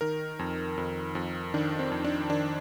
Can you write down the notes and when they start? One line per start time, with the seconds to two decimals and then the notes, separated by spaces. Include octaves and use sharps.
0.01 D#3 A#4
0.39 F2
0.78 F2
1.15 F2
1.54 D#3 D4
1.79 C4
1.92 F2
2.05 D4
2.30 D#3 D4